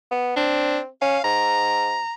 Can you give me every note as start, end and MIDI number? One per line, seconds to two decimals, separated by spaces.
0.11 0.32 59
0.37 0.87 60
0.37 0.78 62
1.02 1.19 61
1.02 1.24 77
1.24 2.01 44
1.24 2.13 82